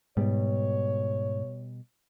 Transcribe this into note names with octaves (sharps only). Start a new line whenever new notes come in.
G#2 B2 G3 C#5